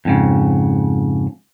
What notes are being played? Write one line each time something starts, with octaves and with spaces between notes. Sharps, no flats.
F2 G#2 C#3